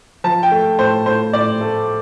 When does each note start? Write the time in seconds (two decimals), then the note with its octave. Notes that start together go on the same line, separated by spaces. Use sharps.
0.24 F3 A5
0.43 G5
0.51 A3
0.78 A2 C5
1.06 A2 C5
1.33 A2 D5
1.61 A3